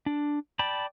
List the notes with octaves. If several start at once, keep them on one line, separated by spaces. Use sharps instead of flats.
D4
D5 G5 A5 B5